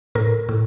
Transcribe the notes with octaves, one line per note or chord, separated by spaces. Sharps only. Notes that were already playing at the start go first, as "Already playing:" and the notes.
A2 A#4
A2